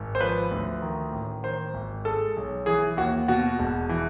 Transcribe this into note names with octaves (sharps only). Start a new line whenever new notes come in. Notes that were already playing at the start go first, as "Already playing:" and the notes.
Already playing: G#1
C5
F3 B4
D2
D#3
A1
D#3 C5
G#1
G#3 A4
B1
E3 G#4
D#2 F#4
B2 F#4
E1
E3